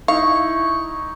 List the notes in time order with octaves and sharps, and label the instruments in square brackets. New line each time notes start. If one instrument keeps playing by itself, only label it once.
[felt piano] D#4 [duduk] E4 [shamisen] F5 [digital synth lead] C#6